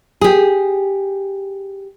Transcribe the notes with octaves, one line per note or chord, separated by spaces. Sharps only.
G4 G#4